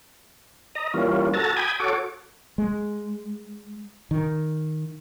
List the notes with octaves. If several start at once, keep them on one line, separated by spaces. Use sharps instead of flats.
D#5 A#5
E3 G3 A#3 C#4 F4
F#4 A4 A5 A#5 A6
G5 G#5 B5 D#6 G#6
F#4 A4 C#5 D6
G#3
D#3